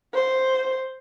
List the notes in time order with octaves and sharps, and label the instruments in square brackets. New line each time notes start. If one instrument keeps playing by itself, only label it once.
[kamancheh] C5